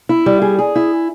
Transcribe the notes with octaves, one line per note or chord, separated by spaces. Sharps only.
E4
G3
G#4
G#4
E4